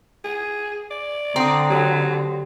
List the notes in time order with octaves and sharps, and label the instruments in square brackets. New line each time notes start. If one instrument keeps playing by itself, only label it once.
[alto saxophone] G#4
D5
[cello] D3 [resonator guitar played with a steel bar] C4 [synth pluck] A#5 D#6
[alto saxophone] F#3 [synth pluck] G4